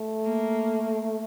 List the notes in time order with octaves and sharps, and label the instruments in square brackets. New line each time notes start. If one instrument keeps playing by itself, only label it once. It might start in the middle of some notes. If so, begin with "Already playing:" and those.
Already playing: [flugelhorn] A3
[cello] A#3